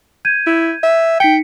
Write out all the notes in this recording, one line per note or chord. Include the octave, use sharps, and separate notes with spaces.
G6 G#6 D#7
E4
E5
D#4 G5 B6 C#7